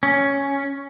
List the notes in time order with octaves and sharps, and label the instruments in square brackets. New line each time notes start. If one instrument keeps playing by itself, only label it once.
[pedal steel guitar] C#4